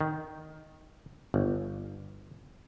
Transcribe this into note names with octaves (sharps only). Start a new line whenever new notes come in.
D#3
G1